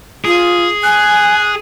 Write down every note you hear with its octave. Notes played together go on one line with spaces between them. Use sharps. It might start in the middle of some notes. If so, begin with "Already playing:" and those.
F4 G#4
G#5 F#6